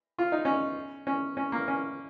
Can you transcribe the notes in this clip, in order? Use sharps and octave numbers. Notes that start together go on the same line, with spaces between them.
F4
D#4
C#4
C#4
C#4
A#3
C#4